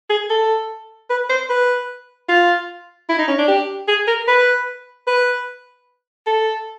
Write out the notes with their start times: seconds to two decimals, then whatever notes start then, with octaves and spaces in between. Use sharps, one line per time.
0.10 G#4
0.30 A4
1.10 B4
1.30 C5
1.50 B4
2.28 F4
3.09 E4
3.18 D#4
3.28 C#4
3.38 D4
3.48 G4
3.88 G#4
4.07 A#4
4.28 B4
5.07 B4
6.26 A4